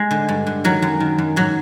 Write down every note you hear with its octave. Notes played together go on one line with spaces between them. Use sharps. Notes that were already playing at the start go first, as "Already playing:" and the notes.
Already playing: G#3
D3
G2
D3
D#3 F#3
F#2
D#3
F#2
G#2 F#3